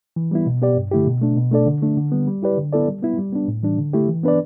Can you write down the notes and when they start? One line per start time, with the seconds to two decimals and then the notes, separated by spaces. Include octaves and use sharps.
0.16 E3
0.31 G3 B3 E4
0.46 B2
0.62 B3 G4 D5
0.76 G2
0.91 D3 A3 E4 G4
1.07 B2
1.22 A3 D4
1.37 B2
1.52 A3 D4 A4 D5
1.67 D3
1.82 A3 D4
1.97 D3
2.12 G3 B3
2.27 G3
2.43 E4 G4 B4 D5
2.58 D3
2.73 B3 E4 A4 D5
2.87 G3
3.03 B3 E4
3.18 G3
3.33 B3 D4
3.48 A2
3.63 E3 G3 D4
3.78 D3
3.93 A3 E4 G4
4.08 E3
4.23 B3 D4 B4 D5